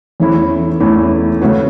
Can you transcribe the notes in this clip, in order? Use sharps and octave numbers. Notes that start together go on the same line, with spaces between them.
E2 E3 A3 C#4 E4
E2 E3 A3 C#4 E4
C#3 A3 C#4 F#4 B4